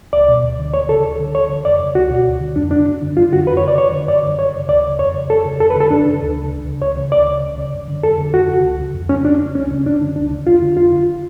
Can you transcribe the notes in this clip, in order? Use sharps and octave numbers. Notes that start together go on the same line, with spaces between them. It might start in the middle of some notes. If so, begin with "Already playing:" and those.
C#2 D5
B2
D2
D3
D2 C#5
C#3 A4
D2
D3
D2 C#5
D3
F2 D5
C#3
C#2 F#4
B2
D2
D3
F2 D4
C#3 D4
F#2
D3
F#2 F4
D3 F#4
F2 B4
C#5
C#3 D5
F2 C#5
D3
F#2 D5
D3
F#2 C#5
C#3
D2 D5
C#3
F2 C#5
C#3
F2 A4
C#3
F2 A4
B4
D3 A4
F#2 D4
C#3
D2
C#3
C#2
C#3
C#2 C#5
C#3
D2 D5
C#3
C#2
C#3
F#2
D3
F2 A4
D3
F2 F#4
C#3
C#2
C#3
F2
C#3 C#4
F2 D4
C#3
C#2 C#4
C#3
F#2 D4
D3
C#2 D4
C#3
F2 F4
D3
F2 F4
D3